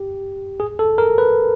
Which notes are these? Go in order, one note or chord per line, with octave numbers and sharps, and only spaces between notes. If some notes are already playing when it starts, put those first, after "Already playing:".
Already playing: G4
G#4
A4
A#4
B4